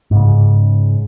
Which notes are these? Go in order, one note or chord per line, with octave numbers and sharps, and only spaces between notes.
G#2 C#3